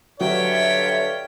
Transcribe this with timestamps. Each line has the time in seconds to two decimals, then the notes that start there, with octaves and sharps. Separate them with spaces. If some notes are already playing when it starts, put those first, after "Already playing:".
0.21 G2 D3 F#3 F4 C#5 E5 G5